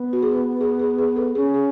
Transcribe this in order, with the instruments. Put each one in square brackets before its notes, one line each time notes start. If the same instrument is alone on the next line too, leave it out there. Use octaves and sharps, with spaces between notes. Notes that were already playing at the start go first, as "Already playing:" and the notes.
Already playing: [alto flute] B3
[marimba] F#4
G#4
G#4
G#4
G#4
A4
[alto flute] C#4 [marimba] G#4
[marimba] G#4